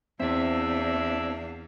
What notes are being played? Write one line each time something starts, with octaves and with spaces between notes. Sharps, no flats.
E2 C4 D4 E4 E5 F5